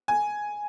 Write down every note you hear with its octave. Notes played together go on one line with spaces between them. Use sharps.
G#5